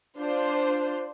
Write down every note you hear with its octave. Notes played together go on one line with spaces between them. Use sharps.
D4 F4 C5